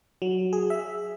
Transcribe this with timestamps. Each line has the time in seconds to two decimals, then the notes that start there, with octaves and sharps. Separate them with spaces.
0.22 F#3
0.53 G#4
0.70 E5